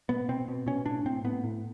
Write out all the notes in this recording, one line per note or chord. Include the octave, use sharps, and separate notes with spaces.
B2 B3
B2 C4
B2
B2 C#4
A2 D4
A2 C4
A2 B3
A2